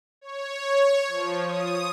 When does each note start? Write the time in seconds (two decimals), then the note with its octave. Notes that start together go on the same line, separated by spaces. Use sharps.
0.21 C#5
1.08 F3
1.44 D#6